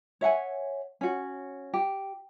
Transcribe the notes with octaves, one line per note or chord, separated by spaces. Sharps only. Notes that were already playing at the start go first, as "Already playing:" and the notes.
C#5 E5 F#5 G#5
C#4 F#4
G4